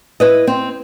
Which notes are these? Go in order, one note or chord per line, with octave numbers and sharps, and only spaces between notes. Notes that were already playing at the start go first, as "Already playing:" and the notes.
E4 B4 D#5
C4